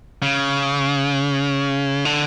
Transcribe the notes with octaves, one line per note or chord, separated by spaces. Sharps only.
C#3
D3